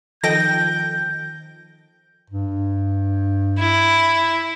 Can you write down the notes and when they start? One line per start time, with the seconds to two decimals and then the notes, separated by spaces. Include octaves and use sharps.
0.24 D#3 F3 A4 D#5 G5 A5 G6 A#6
2.30 G2
3.59 E4